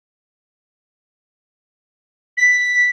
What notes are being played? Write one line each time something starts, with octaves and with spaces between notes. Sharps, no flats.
B6